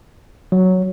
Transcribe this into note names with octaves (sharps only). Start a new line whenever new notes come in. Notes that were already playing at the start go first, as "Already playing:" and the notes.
F#3